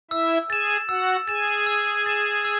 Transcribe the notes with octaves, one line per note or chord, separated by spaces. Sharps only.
E4 E5 E6
G#4 G#5 A6 E7
F#4 F#5 E6
G#4 G#5 A6 E7
E6
A6 E7
E6